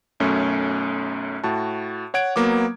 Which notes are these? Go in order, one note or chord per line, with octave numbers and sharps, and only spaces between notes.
B1 F#2 A3 C#4
A2 F#4 A5
C#5 F#5 G#6 D7
F#3 A#3 B3 D6